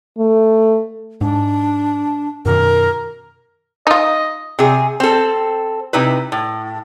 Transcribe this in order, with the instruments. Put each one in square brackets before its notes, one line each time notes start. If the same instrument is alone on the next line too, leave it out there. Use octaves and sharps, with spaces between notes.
[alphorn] A3
[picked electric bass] G#2 [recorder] D4
[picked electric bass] F#2 B2 D#3 [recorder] A#4
[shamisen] D#4 F4 [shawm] D#5
[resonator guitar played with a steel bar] C3 G#4
C4 A4
C3 D#4 E4 B4
A2